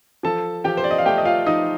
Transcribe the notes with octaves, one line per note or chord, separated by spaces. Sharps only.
F3 A4 A5
F3 G4 G5
C5
D5
D#5
F5
A3 G4 G5
D#5
F4 F5
F3 D#4 D#5